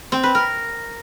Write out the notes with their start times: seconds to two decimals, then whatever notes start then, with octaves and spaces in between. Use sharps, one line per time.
0.12 C4
0.23 B4
0.35 A#4